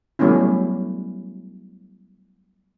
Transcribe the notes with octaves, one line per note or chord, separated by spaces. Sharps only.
F#3 G3 A3 B3 C#4 E4